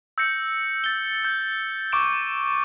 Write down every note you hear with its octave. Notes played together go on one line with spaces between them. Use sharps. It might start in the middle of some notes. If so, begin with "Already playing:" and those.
E6 G6 A#6 C#7
A6 G7
G6
C#6 D6 D7 E7